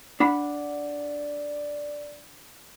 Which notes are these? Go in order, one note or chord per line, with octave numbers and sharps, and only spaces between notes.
D4 D5 F#5 B5